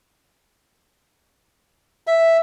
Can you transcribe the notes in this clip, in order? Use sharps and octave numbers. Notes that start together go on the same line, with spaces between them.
E5